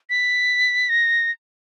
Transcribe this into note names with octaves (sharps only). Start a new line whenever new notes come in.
B6
A#6